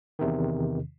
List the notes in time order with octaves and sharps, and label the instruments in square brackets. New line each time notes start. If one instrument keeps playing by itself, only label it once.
[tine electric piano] E2 C3 D#3